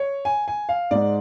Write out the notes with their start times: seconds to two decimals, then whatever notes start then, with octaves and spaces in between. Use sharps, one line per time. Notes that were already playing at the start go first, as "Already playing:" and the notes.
Already playing: C#5
0.25 G#5
0.48 G#5
0.69 F5
0.91 G#2 G#3 D5